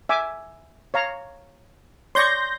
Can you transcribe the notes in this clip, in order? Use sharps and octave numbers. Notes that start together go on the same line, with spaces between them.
E5 G#5 D6
C#5 F5 A#5
C#5 D5 C6 C#6 G6 A#6